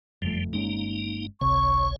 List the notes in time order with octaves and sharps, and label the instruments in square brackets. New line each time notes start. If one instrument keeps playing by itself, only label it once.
[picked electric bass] F#1 F2 A3 [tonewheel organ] F3 G3
[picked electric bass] G1 G#3 C#4 [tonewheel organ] A#3 D#4
[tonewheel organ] G#1 C#2 C#5 [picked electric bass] C3 [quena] C#6